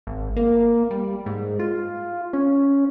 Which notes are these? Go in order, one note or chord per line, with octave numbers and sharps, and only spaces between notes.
G#1
A#3
G3
G#2
F4
C#4